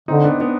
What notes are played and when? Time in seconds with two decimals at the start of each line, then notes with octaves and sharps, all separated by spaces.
0.08 D3 C4 D#4
0.24 B3 D4
0.40 B3 D4